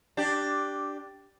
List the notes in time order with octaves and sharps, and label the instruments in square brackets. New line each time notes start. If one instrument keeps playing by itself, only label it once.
[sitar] D4 G4